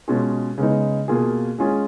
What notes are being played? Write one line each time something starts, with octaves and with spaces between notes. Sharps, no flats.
B2 G#3 C#4 F4 G#4
C#3 G#3 B3 D#4
B2 A#3 F4 G#4
G#3 C#4 F4 G#4